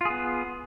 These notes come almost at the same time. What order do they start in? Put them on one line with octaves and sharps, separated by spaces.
F4 G#4 B3